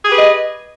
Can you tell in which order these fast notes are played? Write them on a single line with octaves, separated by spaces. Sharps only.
G#4 G4 B4 D#5